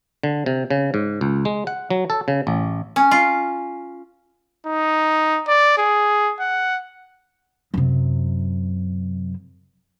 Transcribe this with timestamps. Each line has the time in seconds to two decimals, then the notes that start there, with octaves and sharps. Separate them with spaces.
0.24 D3
0.46 C3
0.71 C#3
0.94 G#2
1.21 C#2
1.45 G#3
1.67 F#5
1.90 F#3
2.10 A4
2.28 C#3
2.47 A1
2.96 C#4
3.11 F4
4.66 D#4
5.48 D5
5.78 G#4
6.40 F#5
7.74 F#2 C3